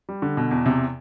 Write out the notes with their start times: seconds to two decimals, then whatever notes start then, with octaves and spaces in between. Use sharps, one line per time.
0.09 G3
0.22 D3
0.37 B2
0.51 E2
0.66 C3